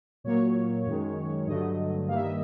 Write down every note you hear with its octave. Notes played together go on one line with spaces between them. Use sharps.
A#2 F#3 A#3 C#5
F#2 D#3 G#3
G2 D3 F#3 A3 D#5
G2 D#3 G3 A#3 F5
E5
D#5